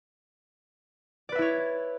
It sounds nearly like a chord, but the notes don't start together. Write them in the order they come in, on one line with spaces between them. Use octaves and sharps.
D5 B4 E5 E4 C#5